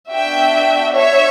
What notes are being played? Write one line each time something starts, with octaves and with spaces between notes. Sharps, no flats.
B3 D4 F#4 E5 G5
C#5 E5